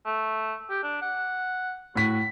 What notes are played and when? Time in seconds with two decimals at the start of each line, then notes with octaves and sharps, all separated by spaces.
0.06 A3
0.70 G4
0.83 D4
1.02 F#5
1.96 A2 F#4 B6